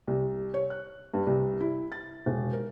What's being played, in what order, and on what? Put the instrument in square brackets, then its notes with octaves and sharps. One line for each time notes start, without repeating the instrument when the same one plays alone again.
[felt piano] C2
C#5
F#6
G2
C2
E4
A6
E1
A#4